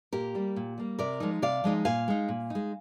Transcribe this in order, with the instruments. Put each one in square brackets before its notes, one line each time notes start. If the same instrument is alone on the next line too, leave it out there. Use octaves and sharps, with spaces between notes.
[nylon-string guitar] A#2 G4 A#4
G3 A#3
A#2
G3 A#3
C3 A#4 D5
F3 G#3 D#4
C3 D5 F5
F3 G#3 D#4
A#2 F5 G#5
G#3 D#4
A#2
G#3 D#4